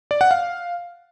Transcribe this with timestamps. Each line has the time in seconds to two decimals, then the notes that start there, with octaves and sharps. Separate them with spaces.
0.11 D5
0.21 F#5
0.31 F5